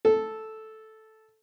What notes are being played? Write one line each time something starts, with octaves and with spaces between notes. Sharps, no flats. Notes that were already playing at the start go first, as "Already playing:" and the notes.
A4